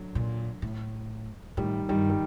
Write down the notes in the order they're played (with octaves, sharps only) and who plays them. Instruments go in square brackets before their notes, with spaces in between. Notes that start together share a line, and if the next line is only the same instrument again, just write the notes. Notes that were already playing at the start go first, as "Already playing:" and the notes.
Already playing: [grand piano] D3 F#3
[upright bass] A#2
A2
[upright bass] A2 [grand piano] D#3 G3
[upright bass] G2 [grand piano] D#3 G3
[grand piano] G3